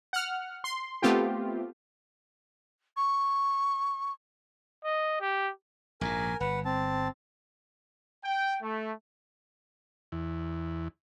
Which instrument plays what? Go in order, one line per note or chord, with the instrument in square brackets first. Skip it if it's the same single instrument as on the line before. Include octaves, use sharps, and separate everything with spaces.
[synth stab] F#5 F6
C6
A3 B3 C4 F4 G4
[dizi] C#6
[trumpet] D#5
G4
[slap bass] A#1 G#2 [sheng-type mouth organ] A#4 G#5
[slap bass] G1 [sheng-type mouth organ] B4 F#5
[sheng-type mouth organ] C4 A5
[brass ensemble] G5
A3
[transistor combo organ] E2